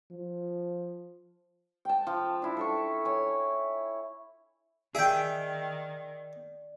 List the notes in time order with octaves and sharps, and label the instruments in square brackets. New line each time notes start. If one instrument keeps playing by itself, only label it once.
[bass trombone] F3
[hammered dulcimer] G5 A5
F3
D4 E4
A4 E5 C#6
C#5 G#5
[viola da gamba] D#3 [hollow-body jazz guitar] G#4 [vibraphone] D5 [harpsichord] E5 G5